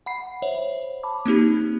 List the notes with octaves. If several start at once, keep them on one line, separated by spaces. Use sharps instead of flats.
F#5 B5 C7
C5 C#5 E5
A5 B5 D6
A#3 C4 D#4 G4